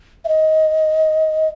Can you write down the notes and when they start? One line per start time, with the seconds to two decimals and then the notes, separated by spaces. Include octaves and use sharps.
0.25 E5
0.28 D#5